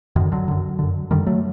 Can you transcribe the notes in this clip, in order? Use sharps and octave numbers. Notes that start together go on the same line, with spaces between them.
F#2 D3 D#3
D3 F#3
F#2 D3
F#2 D3
F#2 D3 D#3 G3
F#3 A3